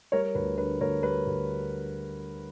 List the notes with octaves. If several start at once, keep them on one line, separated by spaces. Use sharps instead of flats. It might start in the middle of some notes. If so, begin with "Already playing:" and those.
G3 A#4 C#5
D2 B4
D3 B4
D2 A#4 C#5
G3 B4
D2